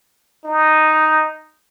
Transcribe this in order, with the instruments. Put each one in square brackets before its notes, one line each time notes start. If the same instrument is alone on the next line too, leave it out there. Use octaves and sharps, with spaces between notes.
[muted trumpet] D#4